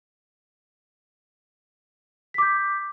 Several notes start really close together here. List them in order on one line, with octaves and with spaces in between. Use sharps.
B6 D6 G6